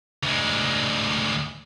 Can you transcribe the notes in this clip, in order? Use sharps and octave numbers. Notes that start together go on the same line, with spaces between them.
D2 G#3